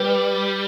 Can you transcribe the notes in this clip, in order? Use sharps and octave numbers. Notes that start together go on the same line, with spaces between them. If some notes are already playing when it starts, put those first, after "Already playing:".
Already playing: G3 B4